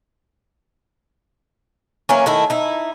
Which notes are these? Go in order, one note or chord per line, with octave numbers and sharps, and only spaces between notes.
E3 F#3 A#3 C#4
D#3 A3 E4
D#4 E4